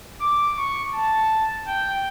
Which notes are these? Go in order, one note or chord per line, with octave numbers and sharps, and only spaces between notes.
D6
C#6
A5
G5